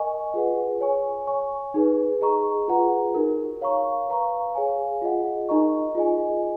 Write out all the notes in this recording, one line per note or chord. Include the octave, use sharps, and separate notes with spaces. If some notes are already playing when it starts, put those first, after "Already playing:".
Already playing: A#4 D#5 G#5 C#6
F4 G#4 B4 F#5
C#5 G#5 C#6
C#5 G#5 C#6
D#4 G#4 B4
G#4 D#5 A#5 C#6
F4 G#4 B4 F#5 A#5
D#4 F#4 A#4
C#5 F5 A#5 C#6
B4 F5 A#5 C#6
G#4 C#5 F5 G#5
F4 G#4 D#5 F#5
D#4 A#4 D#5 A#5 C#6
F4 G#4 D#5 G#5